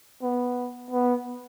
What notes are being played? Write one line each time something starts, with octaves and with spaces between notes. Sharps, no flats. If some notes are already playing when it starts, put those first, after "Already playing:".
B3
B3